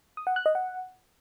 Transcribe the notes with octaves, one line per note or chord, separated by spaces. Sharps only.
D#6
F#5
F#6
D#5
F#5